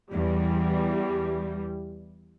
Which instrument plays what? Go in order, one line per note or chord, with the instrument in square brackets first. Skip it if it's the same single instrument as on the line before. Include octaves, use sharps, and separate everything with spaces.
[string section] E2 [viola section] G3